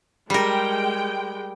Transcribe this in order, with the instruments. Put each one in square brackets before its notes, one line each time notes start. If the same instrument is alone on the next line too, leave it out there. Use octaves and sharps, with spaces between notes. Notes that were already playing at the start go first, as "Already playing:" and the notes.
[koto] G3 A#4 [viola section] G#3 G5